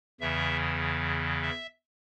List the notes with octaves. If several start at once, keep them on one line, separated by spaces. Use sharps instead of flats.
E2 C#3 E3 E5
E5